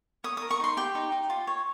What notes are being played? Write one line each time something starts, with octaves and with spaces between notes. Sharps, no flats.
C#5 D#6
D#6
A#4
C#6
D#4 C6
G4 G5
D#4
D#4
F4
C#5